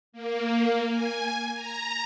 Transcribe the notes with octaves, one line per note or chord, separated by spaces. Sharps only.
A#3
G#5
A#5